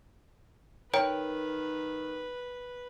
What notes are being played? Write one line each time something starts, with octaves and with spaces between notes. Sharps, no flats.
D#3 A#4 B4 C#5 G5 D7